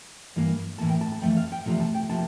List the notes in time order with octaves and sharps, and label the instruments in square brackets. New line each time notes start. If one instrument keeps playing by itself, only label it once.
[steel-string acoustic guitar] G2 E3 A#3
A2 E3 A#3 A5
G5
A5
A5
F2 E3 A3 G5
F5
G5
E2 C3 F3 A3 A#5
A5
G5
C3 F3 A#3 A5